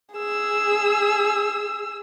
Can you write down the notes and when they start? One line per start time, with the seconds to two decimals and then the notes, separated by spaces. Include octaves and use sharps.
0.13 G#4 E6